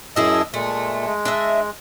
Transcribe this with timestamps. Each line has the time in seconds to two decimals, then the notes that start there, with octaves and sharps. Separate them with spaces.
0.16 F#2 D4 E4 G#4 D#5 E6
0.54 A#2 G#3 A3
1.06 G#3
1.25 D4 D#5 E5